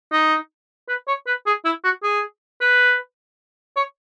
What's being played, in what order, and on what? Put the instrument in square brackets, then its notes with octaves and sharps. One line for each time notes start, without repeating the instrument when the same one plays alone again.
[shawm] D#4
B4
C#5
B4
G#4
E4
F#4
G#4
B4
C#5